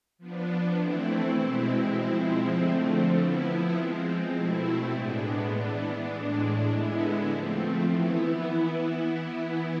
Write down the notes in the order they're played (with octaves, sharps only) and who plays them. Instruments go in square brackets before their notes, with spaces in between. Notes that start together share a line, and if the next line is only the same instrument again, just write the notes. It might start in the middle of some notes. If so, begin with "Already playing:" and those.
[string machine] F3 B3 D4
E3 A3 C4 E4
B2 G#3 C4 E4
F3 G#3 C4 E4
D3 F3 A3 C4
F3 B3 E4
F3 G#3 C4
B2 A3 C4 E4
A2 G#3 B3 D4
E3 B3 D4
A2 G#3 D4
D3 G#3 B3 E4
F3 A3 C4
E3 B3 E4